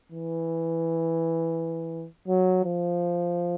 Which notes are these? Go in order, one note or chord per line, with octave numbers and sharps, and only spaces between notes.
E3
F#3
F3